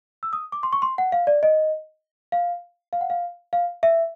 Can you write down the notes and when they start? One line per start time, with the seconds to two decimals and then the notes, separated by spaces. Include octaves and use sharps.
0.23 E6
0.33 D#6
0.52 D6
0.63 C6
0.73 C#6
0.82 C6
0.98 F#5
1.12 F5
1.27 D5
1.43 D#5
2.32 F5
2.93 F5
3.01 F#5
3.10 F5
3.53 F5
3.83 E5